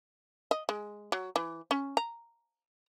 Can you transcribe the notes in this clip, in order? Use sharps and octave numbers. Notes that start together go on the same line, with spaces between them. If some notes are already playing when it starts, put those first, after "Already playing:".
D#5
G#3
F#3
E3
C#4
A#5